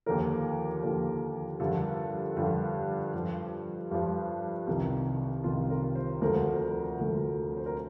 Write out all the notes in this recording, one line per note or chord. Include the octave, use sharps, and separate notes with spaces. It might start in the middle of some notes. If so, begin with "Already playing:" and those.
D#2 D3 F3 A#4
D#2 D3 F3
G2 D3 F3 A4
G2 D3 F3 G4
G2 F3
G2 F3
C2 C3 D#3
C2 C3 D#3 F4
A#4
C5
D2 D3 F3 A#4
D2 D3 F3
C5
A#4